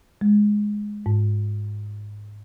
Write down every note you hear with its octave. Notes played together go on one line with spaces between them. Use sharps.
G#3
G#2